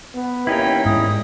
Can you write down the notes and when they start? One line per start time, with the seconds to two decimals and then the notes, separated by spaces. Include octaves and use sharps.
0.15 B3
0.47 D#2 C#4 D#4 E4 G5
0.85 E2 G#2 D#6